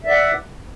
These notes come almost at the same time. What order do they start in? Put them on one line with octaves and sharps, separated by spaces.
E5 D5 F#5